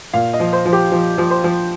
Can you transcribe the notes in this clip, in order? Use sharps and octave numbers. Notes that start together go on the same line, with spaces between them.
A#2 F5
D#5
F3
C5
F3
G4
F3
F3
C5
F3